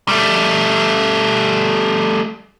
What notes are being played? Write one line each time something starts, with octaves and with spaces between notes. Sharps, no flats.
G3 A3